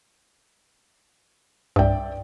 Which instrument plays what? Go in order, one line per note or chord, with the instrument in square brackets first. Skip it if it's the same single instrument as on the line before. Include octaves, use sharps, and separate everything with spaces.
[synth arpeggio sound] C2 G2 [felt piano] D5 E5 G5